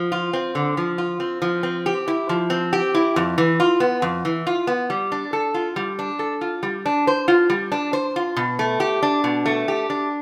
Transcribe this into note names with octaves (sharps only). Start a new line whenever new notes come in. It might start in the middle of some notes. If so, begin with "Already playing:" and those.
Already playing: F3
F4
C4
D3
F3
F4
C4
F3
C4
G4
E4
F3
C4
G4
E4
F2
E3
F4
B3
F2
E3
F4
B3
G3
D4
A4
F4
G3
D4
A4
F4
G3
D4
C5
F4
G3
D4
C5
F4
B2
A3
G4
D4
B2
A3
G4
D4